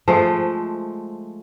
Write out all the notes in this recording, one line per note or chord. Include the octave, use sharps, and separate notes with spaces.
F3 G#3 A3